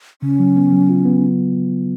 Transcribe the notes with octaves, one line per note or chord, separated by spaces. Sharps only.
C#3 C#4
F#3
B3
F#3
F4
B3